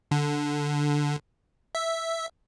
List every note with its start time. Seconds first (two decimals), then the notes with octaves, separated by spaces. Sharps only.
0.11 D3
1.75 E5